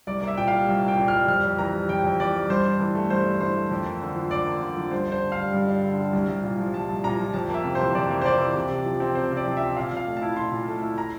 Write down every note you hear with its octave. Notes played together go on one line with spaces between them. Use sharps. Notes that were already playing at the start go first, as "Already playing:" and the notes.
C2 D5
A#3 D5
E5
A#2 G5
G3 F5
C2
A#3 G5
A#2
G3 F6
F2 F6
F2
E3 A#5
G3
F2 G5
F2
E3 D5
G3
G2 C5
D4
E3
A3
G2 C5
D4
E3 C5
A3
F2
A#3
D3
F3
F2 D5
A#3
D3
F3
G2 C5
D4
C5
D3
F5
G3
G2
D4
D3
G3
C2
C2
A#2
F3
C2 A5
C2
A#2 A#5
F3
F2 A5
A#3 E5
C3
C5
E3
F2 D5
A#3
C5
C3 D5
E3
C3
C3
F3
C4
C3 C5
C3
D5
F3
C4 E5
A#2 F5
A#2 F5
A3
E4 A5
A#2 C6
A#2
A3
E4
A#5